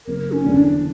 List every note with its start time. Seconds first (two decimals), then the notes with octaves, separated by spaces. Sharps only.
0.06 F#1 A#4
0.32 C#4
0.44 E2 D3
0.57 D4